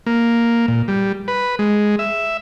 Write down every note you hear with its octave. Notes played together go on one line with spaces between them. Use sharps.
A#3
A#2
G3
B4
G#3
E5